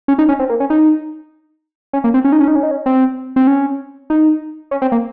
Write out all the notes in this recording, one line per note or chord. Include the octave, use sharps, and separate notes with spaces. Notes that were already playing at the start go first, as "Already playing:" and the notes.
C#4
D#4
C#4
C4
A#3
C#4
D#4
C#4
A#3
C4
C#4
D#4
C#4
D#4
C#4
D#4
C#4
C4
C4
C#4
D#4
C#4
C4
A#3